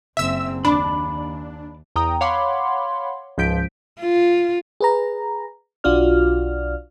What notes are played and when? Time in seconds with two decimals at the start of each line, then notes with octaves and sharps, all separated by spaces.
0.17 F#1 C4 E5 E6
0.65 D#2 D4 B5 D6
1.96 E2 G5 A#5 D#6
2.21 C#5 F5 F#5 B5 C6 D6
3.38 C#2 G#2 F3 G6 B6 D7
4.01 F4
4.81 G#4 B4 A#5
5.84 B1 D4 F4 F#4 D5 F6